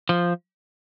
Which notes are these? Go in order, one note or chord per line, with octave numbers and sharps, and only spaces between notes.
F3